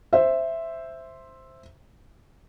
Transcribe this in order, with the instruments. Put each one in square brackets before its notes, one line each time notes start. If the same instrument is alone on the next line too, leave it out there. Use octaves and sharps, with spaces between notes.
[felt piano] C5 E5